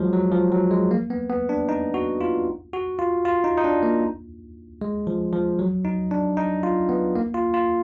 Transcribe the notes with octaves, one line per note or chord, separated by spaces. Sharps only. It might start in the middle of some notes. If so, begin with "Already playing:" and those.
Already playing: F3 F#3 G#3
F#3
F3
F#3
G#3
A#3
B3
B3
D4
D#4
F#4
F4
F#4
F4
F4
D#4
D#4
D4
A#3
G#3
F3
F3
F#3
D#4
D4
D#4
F4
B3
A#3
F4
F4